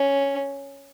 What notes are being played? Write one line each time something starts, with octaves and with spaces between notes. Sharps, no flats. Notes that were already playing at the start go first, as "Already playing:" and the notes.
Already playing: C#4